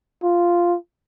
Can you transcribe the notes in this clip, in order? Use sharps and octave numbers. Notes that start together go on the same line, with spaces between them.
F4